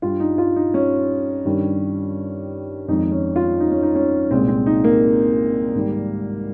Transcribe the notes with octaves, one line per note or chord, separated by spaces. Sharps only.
G2 G3 F4
D#4
F4
D#4
C#4
G2 D#3 G3
F2 D#3 G#3 D#4
C#4
F4
D#4
C#4
D#4
C#4
C2 A#2 G#3 C4
C4
D#4
A#3
G#2 D#3 G3